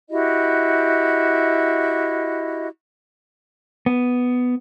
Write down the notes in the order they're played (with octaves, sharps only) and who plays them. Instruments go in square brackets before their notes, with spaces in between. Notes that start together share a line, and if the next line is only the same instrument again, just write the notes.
[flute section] E4 F#4 G4 D#5
[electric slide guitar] B3